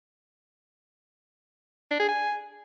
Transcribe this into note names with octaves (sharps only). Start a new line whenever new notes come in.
D4
G#4
G#5